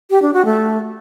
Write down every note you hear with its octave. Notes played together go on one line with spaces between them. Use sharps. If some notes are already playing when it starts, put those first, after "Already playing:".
G4
D4
F#4
A3